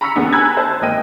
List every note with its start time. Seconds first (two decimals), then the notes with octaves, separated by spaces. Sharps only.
0.01 A#5 B5 C#6 E6 B6 C#7
0.15 D#2 C#3 G#3 B3 D4
0.33 G#5 A#5 B5 E6 F#6 G#6
0.57 C5 A5
0.81 G#1 A#3 D#5 G5 D#7